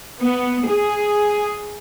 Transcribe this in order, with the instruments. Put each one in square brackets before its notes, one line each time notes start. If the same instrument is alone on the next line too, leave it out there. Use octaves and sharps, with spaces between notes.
[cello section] B3
G#4